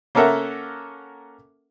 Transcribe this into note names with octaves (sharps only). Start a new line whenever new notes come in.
A#3 C#4 A4 A#4 E5 F#5